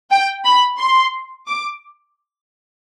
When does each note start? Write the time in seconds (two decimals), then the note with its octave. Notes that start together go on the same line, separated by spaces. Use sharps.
0.11 G5
0.45 B5
0.79 C6
1.47 D6